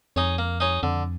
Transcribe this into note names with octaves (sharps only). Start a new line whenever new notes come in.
F2 D#4 G#4 C#5
A#3
D#4 G#4 C#5
F2 D3